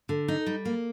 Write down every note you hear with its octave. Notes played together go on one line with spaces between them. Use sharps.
D3
D#4
G3
A#3